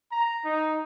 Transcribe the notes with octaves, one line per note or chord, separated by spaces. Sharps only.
A#5
D#4